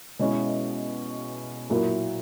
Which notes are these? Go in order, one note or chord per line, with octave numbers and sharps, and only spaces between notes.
B2 G#3 C#4 E4
A#2 F#3 A#3 E4